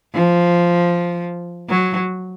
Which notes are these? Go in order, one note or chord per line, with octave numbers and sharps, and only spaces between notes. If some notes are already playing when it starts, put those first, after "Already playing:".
F3
F#3